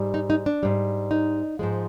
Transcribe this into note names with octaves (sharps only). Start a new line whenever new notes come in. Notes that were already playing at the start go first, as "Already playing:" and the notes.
Already playing: G#2 G3
D#4
D#4
D4
G#2 G3
D#4
G#2 F3 G#3